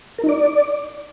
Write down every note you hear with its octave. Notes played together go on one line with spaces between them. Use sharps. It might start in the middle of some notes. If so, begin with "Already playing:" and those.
A#4
D#4
D5